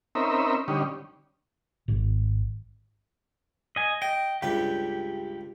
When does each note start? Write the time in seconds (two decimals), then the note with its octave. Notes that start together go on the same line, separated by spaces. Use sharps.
0.15 C4 C#4 D#4 A#4 E5 B5
0.68 D3 G3 C#4 D#4
1.88 G#1
3.76 D#5 G#5
4.02 D#5 G5
4.42 C#2 G2 G4 B4